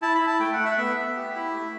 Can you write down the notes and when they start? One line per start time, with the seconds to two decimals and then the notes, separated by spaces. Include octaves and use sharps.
0.02 E4 A5
0.15 B5
0.21 E4
0.27 A5
0.40 A3 G5
0.53 F#5
0.59 A3
0.65 E5
0.71 F#5
0.78 B3 E5
0.97 B3
1.16 G4
1.35 E4
1.54 A3